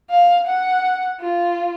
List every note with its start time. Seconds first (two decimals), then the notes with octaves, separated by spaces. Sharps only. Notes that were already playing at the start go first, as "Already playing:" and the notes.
0.11 F5
0.46 F#5
1.21 F4